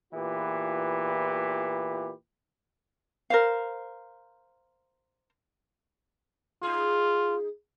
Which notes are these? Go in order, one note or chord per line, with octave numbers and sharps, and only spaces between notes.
E2 A#2 E3 F4 G4 B4
A#4 C5 F5
D#4 F4 G#4